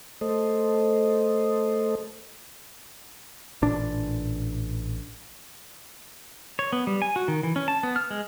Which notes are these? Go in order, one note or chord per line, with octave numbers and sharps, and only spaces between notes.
A3 A4 C5 D#5
A1 A#2 D4
C#5
B3
G3
G#5
F#4
D#3
E3
C#4
A5
B3
F6
G#3